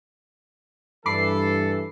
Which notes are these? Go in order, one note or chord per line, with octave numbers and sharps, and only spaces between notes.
G2 E3 A4 B5 D6 C7